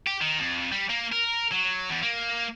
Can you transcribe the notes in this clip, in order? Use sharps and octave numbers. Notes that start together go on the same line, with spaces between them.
G4
D#3
F2
G3
A#3
A#4
F#3
E2
A#3